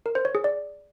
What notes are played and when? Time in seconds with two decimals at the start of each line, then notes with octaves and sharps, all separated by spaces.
0.06 A#4
0.15 C5
0.25 C#5
0.35 G#4
0.44 D5